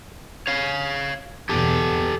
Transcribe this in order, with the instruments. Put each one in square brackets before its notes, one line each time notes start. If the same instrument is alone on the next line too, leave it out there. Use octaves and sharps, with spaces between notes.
[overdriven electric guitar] C#5 F5
[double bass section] E2 B2 [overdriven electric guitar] G4 A4